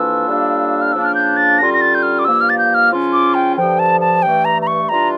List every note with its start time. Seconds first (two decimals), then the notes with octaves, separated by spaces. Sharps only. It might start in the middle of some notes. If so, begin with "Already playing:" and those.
Already playing: F2 E3 A#3 D4 F4 E6
0.27 A2 G3 A#3 D4 F4
0.81 F6
0.93 C#3 F3 A#3 D4 E6
1.05 F6
1.15 G6
1.37 A6
1.58 D3 G3 C#4 F4 A#6
1.74 A#6
1.81 A6
1.95 G6
2.03 F6
2.19 D6
2.25 G2 F3 A#3 E6
2.41 F6
2.50 A6
2.58 G6
2.74 F6
2.90 C#3 F3 C#4 F4
3.13 D6
3.34 G5
3.57 G2 D3 F3 G5
3.79 A5
4.01 A5
4.22 G2 E3 A3 G5
4.45 A#5
4.62 A#5
4.67 C#6
4.89 E3 G3 D4 F4 A#5